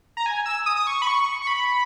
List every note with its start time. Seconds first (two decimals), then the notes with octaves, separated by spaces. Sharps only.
0.17 A#5
0.26 G#5
0.46 E6
0.66 D#6
0.76 D#6
0.87 C#6
1.02 B5
1.07 C#6
1.42 C#6
1.47 B5